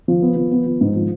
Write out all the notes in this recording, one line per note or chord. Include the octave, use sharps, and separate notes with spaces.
F3
B3
F3
B3
F3
G#2
F3